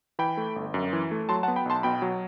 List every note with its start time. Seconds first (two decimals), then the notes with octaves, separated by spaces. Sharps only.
0.19 E3 G5 B5
0.37 A3
0.56 G1
0.74 F#2
0.93 E3
1.11 A3
1.29 F#3 A5 C6
1.43 F#5 A5
1.48 B3
1.56 G5 B5
1.66 B1 A5 C6
1.83 B2 G5 B5
2.02 F#3